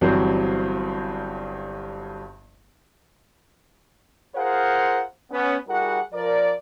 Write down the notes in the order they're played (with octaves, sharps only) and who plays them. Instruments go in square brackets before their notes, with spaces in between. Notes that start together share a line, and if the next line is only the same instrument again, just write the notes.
[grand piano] G1 G2 E3 F#3 C4 C5
[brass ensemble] F4 G#4 A#4 C5 F5 F#5
B3 C#4
G3 E4 F#4 G#4 A#4 F#5
F3 A#4 D5